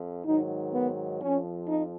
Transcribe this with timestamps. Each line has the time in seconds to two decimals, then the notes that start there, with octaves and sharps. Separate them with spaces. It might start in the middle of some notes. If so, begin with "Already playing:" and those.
Already playing: F2
0.25 G#2 D#3 F#3 D#4
0.73 B3
1.21 F2 F3 C#4
1.68 D#4